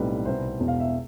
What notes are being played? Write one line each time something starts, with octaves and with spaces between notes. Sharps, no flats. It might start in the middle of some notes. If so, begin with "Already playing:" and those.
Already playing: B1 A2 G3 C4 B4
C2 B2 B3 C5
E1 E2 B2
F5
E5